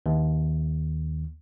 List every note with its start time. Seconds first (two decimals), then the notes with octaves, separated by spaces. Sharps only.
0.06 D#2